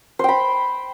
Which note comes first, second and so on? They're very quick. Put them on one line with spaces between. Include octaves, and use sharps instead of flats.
C5 G5 B5